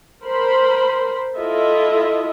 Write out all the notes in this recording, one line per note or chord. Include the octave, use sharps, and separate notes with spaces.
A#4 C5 B5
E4 F4 A4 D#5 E5